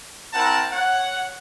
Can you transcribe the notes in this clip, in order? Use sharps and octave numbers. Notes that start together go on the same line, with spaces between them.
C4 E4 A#4 F#5 A5
C#5 F#5